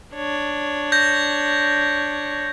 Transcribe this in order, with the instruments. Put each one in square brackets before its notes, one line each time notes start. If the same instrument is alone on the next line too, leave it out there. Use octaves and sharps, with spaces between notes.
[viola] D4 C#5
[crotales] G6 A#6